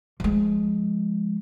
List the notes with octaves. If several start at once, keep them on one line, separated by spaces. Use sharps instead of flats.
F3 G#3